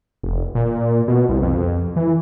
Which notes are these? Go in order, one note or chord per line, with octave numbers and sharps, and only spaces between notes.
F1
A#2
B2
C2
F2
E3